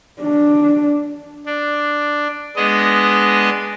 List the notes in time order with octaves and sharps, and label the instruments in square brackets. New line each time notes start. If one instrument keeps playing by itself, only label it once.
[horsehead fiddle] D4
[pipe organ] D4
G#3 B3 D4 D#5